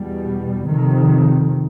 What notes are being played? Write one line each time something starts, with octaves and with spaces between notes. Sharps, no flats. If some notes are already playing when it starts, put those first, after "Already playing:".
Already playing: E2 B2 G3
F2 C3 D#3